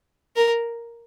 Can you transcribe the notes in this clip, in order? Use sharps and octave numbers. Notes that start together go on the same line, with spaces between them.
A#4